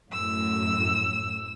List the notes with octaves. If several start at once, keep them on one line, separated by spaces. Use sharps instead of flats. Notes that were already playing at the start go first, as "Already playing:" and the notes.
F#2 A2 E6